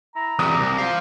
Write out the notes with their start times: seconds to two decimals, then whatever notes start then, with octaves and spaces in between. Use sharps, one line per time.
0.16 E4 A#5
0.39 E2 C3 D5 D#6
0.58 C2
0.78 C5 F5